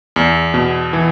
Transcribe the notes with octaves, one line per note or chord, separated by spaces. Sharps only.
E2
B2
E3